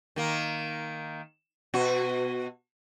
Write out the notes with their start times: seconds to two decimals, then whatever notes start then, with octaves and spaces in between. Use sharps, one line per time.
0.16 D#3 A#3
1.74 B2 F#4